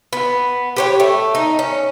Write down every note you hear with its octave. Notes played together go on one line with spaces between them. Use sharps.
B3
G4 B4 C#5
A3
D#4
C#4